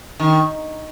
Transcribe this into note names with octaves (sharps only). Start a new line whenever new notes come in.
D#3